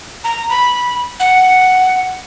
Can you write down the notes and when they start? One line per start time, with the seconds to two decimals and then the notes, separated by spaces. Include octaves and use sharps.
0.24 A#5
0.50 B5
1.20 F#5